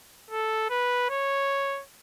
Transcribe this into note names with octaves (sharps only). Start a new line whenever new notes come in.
A4
B4
C#5